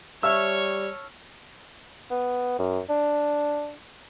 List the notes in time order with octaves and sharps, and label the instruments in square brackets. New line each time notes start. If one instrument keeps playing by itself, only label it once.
[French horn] G3 [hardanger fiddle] C#5 [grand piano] E5 E6 [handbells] A5 C#6 F6
[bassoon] B3
F#2
D4